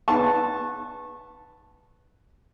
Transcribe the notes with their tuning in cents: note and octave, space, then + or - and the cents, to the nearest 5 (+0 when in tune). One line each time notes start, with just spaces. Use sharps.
B3 +0 A5 +0 C#6 -25